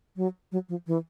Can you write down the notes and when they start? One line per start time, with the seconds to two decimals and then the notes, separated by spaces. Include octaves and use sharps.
0.16 F#3
0.52 F#3
0.69 F3
0.87 E3